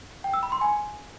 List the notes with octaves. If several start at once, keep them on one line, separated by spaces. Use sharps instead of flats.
G5
E6
B5
C6
G#5